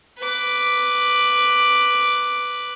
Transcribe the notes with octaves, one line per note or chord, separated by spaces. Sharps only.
B4 D6